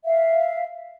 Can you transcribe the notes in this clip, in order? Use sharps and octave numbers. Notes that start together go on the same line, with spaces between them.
E5 F5